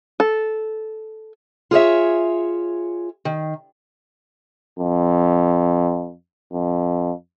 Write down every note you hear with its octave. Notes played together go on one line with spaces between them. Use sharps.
A4
F4 G#4 C#5 E5
D#3
F2
F2